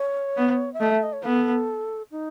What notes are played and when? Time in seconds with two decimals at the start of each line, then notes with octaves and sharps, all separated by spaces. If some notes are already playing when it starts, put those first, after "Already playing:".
Already playing: C#5
0.37 B3
0.74 E5
0.81 A3 D#5
0.91 E5
1.03 D#5
1.13 C#5
1.24 B3 A4
2.11 D#4